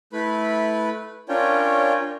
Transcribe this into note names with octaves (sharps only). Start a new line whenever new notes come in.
A3 E4 B4 B5
C#4 D4 F4 A#4 C#5 G5